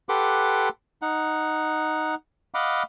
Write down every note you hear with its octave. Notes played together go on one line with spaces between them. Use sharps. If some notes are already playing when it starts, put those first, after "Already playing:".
G4 A4 B4 F#5 C6 D6
D#4 F#5
D#5 F5 F#5 B5 D6